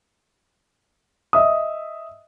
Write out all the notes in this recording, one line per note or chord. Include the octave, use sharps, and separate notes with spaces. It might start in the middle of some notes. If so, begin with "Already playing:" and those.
D#5 E5 D#6